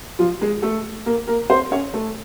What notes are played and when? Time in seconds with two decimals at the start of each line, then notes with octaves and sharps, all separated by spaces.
0.19 F3 F4
0.41 G#3 G#4
0.62 A3 A4
1.06 A#3 A#4
1.27 A#3 A#4
1.50 C4 C5
1.71 C#4 C#5
1.94 A3 A4